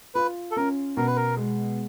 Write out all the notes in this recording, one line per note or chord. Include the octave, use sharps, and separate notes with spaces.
F4 B4
A4
C#4 A#4
B2 A#4
B4
A#4
G#3